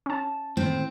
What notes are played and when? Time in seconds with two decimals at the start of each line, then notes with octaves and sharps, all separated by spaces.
0.06 C#4 A5
0.57 D#2 A2 C4